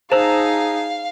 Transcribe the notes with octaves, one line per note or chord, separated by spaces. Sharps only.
D#4 G#4 C5 F5 A5 A#5 E6